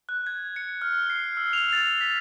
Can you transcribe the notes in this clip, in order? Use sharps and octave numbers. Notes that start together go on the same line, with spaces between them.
F#6
G#6
C#7
F6
C7
E6
F7
A6
A6
B6